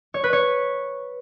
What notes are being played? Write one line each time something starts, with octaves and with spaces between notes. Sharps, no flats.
C#5
B4
C#5